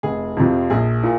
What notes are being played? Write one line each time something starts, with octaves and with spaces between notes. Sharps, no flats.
F1 G#4
F2 C3 F3
A#1 G#4
A#2